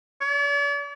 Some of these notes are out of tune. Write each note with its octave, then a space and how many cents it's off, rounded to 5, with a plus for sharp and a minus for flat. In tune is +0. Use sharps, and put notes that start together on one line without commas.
D5 -45